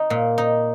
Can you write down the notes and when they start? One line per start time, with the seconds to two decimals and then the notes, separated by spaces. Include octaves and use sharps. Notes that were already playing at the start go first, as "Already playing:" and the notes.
Already playing: D#4
0.10 A#2
0.38 D#4